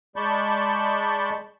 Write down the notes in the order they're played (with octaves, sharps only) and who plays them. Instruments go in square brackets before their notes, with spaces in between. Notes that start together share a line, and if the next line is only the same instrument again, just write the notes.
[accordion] G#3 D5 A5 B5 C#6 G6